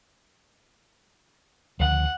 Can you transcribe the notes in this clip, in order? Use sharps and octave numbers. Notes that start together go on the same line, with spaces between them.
D2 C#3 F3 F#5